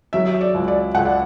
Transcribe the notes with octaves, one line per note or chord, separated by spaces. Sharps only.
F#3 E5
D5
C#2
D5
C#2 F#5
D5